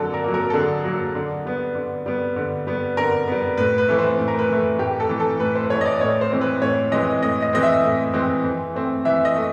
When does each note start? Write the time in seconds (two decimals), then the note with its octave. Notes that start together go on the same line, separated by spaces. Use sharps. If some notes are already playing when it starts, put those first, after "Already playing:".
Already playing: D3 F#3 A#3 A4
0.14 A#4
0.24 F#3 A#3
0.34 A#4
0.50 A4
0.54 D3 G#4
0.84 F#3 A#3
1.15 D3
1.45 G3 B3
1.75 D3
2.06 G3 B3
2.36 D3
2.67 G3 B3
2.97 D3 A#4
3.27 G3 B3
3.58 A2 B4
3.78 B4
3.88 E3 A3
3.98 C5
4.19 A2
4.28 A#4
4.39 B4
4.49 E3 A3
4.79 A2 G4
5.00 A4
5.09 E3 A3
5.20 A4
5.40 A2 B4
5.55 C5
5.70 E3 A3 C#5
5.81 D#5
5.85 D5
6.01 A2 C#5
6.21 C5
6.31 E3 G#3 C4
6.41 B4
6.62 A2 C#5
6.92 E3 G#3 C4 D#5
7.23 A2 D#5
7.42 D#5
7.53 E3 G#3 C4 D#5
7.63 E5
7.84 A2
8.14 E3 G#3 C4
8.44 E3
8.74 A3 C4
9.05 E3 E5
9.25 D#5
9.36 A3